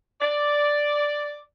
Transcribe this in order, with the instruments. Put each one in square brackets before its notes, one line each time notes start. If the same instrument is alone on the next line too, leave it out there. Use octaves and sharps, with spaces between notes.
[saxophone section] D5